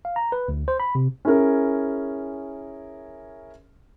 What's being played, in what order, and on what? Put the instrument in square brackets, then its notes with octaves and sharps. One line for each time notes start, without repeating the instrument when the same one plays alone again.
[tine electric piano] F5
A#5
B4
D2
C5
B5
C3
[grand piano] C#4 E4 G#4 A#4